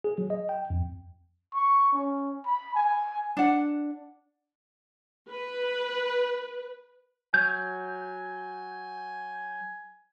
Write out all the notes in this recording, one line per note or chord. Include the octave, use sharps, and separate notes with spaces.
G#4
F#3
D#5
G5
F2
C#6
C#4
B5
G#5
D4 F#5
B4
F#3 G#5 G6